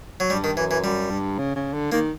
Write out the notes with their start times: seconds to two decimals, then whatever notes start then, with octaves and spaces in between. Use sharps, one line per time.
0.20 F#3
0.30 G2 G3
0.44 D#3
0.57 F#2 E3
0.71 E3
0.84 F#2 G3
1.11 G2
1.38 C#3
1.56 C#3
1.74 D3
1.92 D#3 A#3